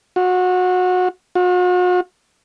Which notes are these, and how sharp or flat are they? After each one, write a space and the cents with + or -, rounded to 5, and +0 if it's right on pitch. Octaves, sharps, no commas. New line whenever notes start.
F#4 -25
F#4 -45